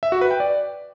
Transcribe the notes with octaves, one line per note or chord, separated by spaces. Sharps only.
E5
F#4
B4
G5
D5